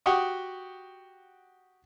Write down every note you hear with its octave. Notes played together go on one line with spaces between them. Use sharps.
F#4 G4 F#5 G5 C#6 D#6